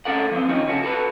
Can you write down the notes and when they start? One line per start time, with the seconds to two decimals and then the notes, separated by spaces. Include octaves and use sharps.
0.05 D2 F3 C#4 A4 A#4 F#5
0.31 F3 B3 C4
0.49 D#3 F3 C4 C#4 D#4
0.66 C#3 C#4 F#4 A4
0.83 F#4 A4 B4